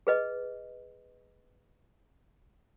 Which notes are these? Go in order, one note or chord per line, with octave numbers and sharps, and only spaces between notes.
G#4 B4 D#5